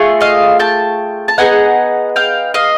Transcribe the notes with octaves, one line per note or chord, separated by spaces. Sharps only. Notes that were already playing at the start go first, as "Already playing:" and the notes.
Already playing: A3 F4 G#4
D#5 F5
G5 A5
A5
B3 D#4 G#4 F#5 G#5
F5 G5
D#5 F5